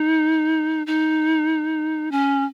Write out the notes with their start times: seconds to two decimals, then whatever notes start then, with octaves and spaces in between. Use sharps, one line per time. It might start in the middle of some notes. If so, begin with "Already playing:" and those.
Already playing: D#4
0.87 D#4
2.11 C#4